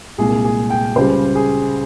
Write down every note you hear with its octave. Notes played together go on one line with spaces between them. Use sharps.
C2 A#2 G#3 G#4
G#4
G5
C#2 C#3 G3 C5
G#4